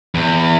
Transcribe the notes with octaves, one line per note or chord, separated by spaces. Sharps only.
E2